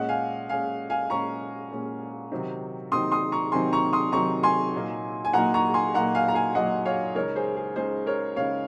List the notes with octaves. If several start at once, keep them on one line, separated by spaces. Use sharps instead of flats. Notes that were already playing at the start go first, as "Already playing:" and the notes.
Already playing: A#2 G#3 C#4 D#5 F#5
F5 G#5
A#2 G#3 C#4 F5 G#5
F5 G#5
A#2 G#3 C#4 A#5 C#6
A#2 G#3 C#4
C3 D#3 F#3 C4 D#4
C3 D#3 F#3 C4 D#4 C6 D#6
C6 D#6
A#5 C#6
C3 D#3 F#3 C4 D#4 G#5 C6
A#5 C#6
C6 D#6
C3 D#3 F#3 C4 D#4 A#5 C#6
G#5 C6
A#2 F#3 A#3 D#4
G#5
A#2 F#3 A#3 D#4 F#5 A#5
A#5 C#6
G#5 C6
A#2 F#3 A#3 D#4 F#5 A#5
F5 G#5
A#5
F5 G#5
A#2 F#3 A#3 D#4 D#5 F#5
C#5 F5
C#2 C#3 G#3 D#4 A#4 C#5
G#4 C5
G#4
C#2 C#3 G#3 D#4 G#4 C5
A#4 C#5
C#2 C#3 G#3 D#4 C#5 F5